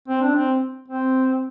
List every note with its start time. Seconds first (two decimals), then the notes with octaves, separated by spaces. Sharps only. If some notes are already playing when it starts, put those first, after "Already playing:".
0.08 C4
0.21 D4
0.35 C4
0.88 C4